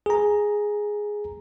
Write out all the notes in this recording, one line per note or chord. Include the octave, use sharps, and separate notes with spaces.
G#4 A#5